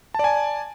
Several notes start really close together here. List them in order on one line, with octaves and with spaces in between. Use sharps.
A5 D5 G#5